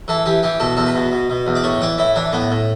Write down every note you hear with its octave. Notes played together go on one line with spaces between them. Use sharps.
E3 A4
E3 G4
E3 G4
B2 A4
E2 A4
B4
B2
B2
B2
E2
D5
A2 C#5
E3 D5
A2 E4
E3 D4
A2 B3
A2